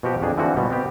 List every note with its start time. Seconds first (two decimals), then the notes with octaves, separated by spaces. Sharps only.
0.03 B2 F3 F#4 G4
0.21 F2 D4 G#4
0.38 D3 E3 F3 C4 F#4
0.57 B2 F3 G3
0.70 B3 C4 G4